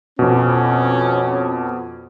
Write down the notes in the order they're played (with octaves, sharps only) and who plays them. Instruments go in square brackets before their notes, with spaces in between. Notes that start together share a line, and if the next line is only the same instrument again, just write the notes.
[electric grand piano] F2 B2 [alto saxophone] C#4